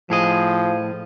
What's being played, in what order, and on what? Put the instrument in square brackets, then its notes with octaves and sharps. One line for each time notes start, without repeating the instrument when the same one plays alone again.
[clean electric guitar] A2 G#4 D#5 [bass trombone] F3